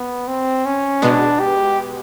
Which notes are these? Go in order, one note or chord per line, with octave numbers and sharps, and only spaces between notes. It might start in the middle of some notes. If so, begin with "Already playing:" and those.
Already playing: B3
C4
C#4
B2 G#3 B3 D4
G4